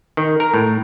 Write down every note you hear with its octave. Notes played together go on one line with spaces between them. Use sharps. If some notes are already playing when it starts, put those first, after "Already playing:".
D#3
A#4
A2